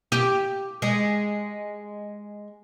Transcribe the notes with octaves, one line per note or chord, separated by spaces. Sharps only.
G4
G#3